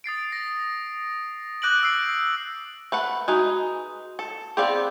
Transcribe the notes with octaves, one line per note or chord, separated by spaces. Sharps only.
D#6 A6 C7 D7
A#6
D6 F#6 G6 A#6 D7 F#7
E6 F#6 C7 D7
A3 B4 F#5
G#3 D#4 F#4 B4
A4
B3 C4 G4 G#4 D5 F5